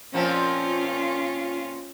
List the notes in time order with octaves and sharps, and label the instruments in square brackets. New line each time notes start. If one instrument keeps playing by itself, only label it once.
[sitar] A#2 F3 C4 [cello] C#4 F4